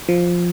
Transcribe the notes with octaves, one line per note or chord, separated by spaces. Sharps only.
F3